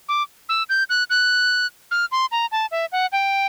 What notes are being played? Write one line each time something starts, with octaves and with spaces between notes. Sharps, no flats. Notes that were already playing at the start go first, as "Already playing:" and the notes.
D6
E6
G6
F#6
F#6
F6
C6
A#5
A5
E5
F#5
G5